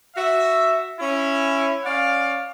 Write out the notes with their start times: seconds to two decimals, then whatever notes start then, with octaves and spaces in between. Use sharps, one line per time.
0.16 F#4 E5
1.00 C#4 E4
1.84 C#4 D5 F5